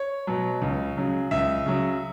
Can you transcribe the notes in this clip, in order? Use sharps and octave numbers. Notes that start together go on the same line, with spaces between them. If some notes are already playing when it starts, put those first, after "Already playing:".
Already playing: C#5
B2 F#3
C#2
C#3 F#3
C#2 E5
C#3 F#3